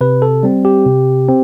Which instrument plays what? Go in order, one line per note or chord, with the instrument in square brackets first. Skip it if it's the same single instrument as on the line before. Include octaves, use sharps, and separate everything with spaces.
[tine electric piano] C3 B4
A4
G3 C4
G4
C3
C4